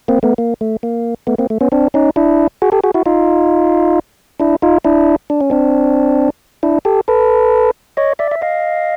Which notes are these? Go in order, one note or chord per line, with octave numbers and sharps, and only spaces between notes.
A#3 C4
A3 B3
A#3
A3
A#3
A3 B3
A#3 C4
A3
B3 C#4
C4 D4
C#4 D#4
D4 E4
F#4 G#4
G4 A4
F#4 G#4
E4 F#4
D#4 F4
D4 E4
D#4 F4
D4 E4
D4
C#4
C4 D4
D4 E4
G4 A4
A4 B4
C#5 D#5
D5 E5
E5
D#5 F5